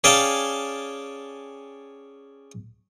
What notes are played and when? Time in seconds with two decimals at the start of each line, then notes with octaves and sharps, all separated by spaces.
0.04 C#4 G#4 D5 F5 G5 A5